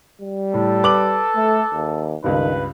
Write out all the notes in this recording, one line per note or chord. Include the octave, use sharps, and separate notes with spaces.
G3
A2 A4
B4 D6 F#7
A3
D#2
C#2 G2 D#3 B4